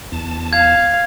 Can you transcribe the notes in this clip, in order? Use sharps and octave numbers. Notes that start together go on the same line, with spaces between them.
E2 A5
F5 G#6